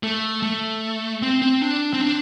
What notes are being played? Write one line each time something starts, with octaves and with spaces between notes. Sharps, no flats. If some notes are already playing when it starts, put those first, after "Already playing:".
A3
A3
C4
C4
D4
C4
D4